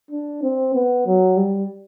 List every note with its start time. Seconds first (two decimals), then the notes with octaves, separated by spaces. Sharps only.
0.11 D4
0.43 C4
0.75 B3
1.06 F#3
1.37 G3